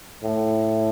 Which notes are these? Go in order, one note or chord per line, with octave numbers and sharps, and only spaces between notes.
A2